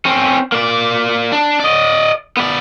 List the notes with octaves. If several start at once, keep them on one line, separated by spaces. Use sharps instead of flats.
C4 C#4
A#3 D5
D4
D5 D#5
B3 D5